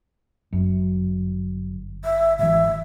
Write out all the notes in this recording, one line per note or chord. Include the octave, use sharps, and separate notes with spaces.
G1 F#2
E5
G#1 E3 E5